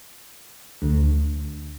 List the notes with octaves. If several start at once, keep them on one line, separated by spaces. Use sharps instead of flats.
D2